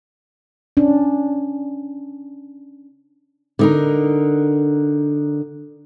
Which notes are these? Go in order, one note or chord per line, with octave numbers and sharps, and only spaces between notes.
C#4 D4
D3 D#4 A#4